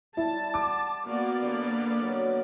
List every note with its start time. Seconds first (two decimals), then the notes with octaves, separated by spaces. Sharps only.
0.17 G3 E4 A5
0.54 G4 F#5 D6
1.06 A#3 B3 F#4 D5
1.42 D3 G4
2.01 F#3 A#4